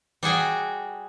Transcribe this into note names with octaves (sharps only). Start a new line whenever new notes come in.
G3 F#4 G#4 G5